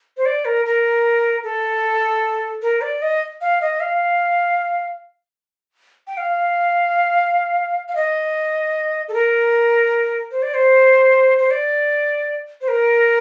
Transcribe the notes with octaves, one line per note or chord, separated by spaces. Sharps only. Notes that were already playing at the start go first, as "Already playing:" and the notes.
C5
D5
A#4
A#4
A4
A#4
D5
D#5
F5
D#5
F5
G5
F5
F5
D#5
A4
A#4
C5
D5
C5
C5
D5
C5
A#4